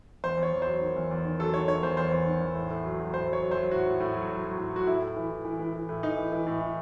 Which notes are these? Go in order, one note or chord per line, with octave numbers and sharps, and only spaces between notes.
E2 C5
E2
C#5
E2
F#3 C5
D#3
E2
E2
D#3
F#3 A4
D#3 C#5
D#3 C#5
E2 C5
E2 C5
E2
D#3
E2
A2
A2
F#3
F#3
A2 C5
F#3 C#5
F#3
C5
F#3
A2 F#4
A2
A2
F#3
F#3
F#3
A2
F#3 F#4
A2 E4
A2
E3
E3
E3
E3
E3
A2
E3 D#4
E3
E3
A2
E3